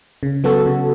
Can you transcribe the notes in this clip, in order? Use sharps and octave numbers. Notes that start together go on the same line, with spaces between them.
C#3
F#3 B3 F#4 A4
C#3